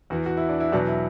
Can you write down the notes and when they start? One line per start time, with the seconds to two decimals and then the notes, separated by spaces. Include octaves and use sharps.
0.10 E2 E3 F#4
0.26 F#4
0.37 E4
0.49 D4
0.60 E4
0.72 E2 B2 F#3 D4
0.88 E4